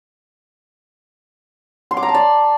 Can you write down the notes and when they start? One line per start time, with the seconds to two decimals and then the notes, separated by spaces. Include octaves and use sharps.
1.91 C6
1.97 D6
2.03 A#5
2.09 A5
2.14 D5